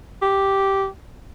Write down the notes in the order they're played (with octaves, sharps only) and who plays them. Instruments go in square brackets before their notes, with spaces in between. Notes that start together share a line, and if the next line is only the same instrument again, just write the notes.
[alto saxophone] G4